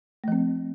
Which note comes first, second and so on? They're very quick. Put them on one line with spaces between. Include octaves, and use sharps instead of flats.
A3 F3 C4